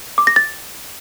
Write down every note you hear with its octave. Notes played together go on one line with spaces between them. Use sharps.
D6
A#6
A6